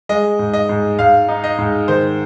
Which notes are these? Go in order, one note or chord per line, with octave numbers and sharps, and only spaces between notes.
G#3 D#5
G#2
D#5
G#2
G#2 F5
D#4
D#5
G#2
D#3 C5